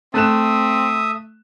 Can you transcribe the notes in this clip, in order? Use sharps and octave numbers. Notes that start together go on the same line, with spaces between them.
A3 C4 E5 D#6 F#6 E7